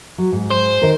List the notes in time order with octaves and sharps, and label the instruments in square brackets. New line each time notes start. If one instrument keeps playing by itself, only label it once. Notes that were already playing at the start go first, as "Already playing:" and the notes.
[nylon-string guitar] F#3
G#2
[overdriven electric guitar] C5
[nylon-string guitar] D#3 A#4